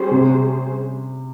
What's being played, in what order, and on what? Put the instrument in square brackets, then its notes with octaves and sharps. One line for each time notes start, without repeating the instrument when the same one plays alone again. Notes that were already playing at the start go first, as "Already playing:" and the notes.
Already playing: [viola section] G3 C#4 G#4 C5
[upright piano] C3